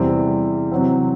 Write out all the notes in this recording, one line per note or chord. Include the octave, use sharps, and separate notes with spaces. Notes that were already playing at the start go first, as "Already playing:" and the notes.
Already playing: E2 C3 E3 G3 C4
C3 F#3 C4